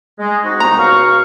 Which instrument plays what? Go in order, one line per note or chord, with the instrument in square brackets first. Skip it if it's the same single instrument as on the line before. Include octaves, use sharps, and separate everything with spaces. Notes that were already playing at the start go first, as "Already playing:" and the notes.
[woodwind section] G#3
[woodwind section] C4 D#4 F#4 [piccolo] A#6
[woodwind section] C2 B3 D#4 [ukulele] A#5
[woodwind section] C#2 F#4 F5 [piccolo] C#6